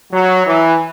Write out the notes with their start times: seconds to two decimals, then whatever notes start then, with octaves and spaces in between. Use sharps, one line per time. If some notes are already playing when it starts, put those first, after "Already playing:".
0.12 F#3
0.46 E3